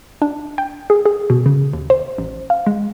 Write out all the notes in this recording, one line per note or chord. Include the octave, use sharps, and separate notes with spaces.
D4
G5
G#4
G#4
B2
C#3
D#2
C5
A1
F5
G#3